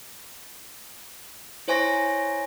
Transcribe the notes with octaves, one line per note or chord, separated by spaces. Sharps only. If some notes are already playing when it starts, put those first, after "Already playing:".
E4 C5 C#5 G#5 C#6 A#6